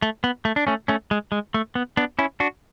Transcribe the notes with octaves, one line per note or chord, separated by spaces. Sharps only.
A3
B3
A3
D4
A3 C#4
A3 C#4
G#3
G#3
A3
B3
B3 D4
C#4 E4
D4 F#4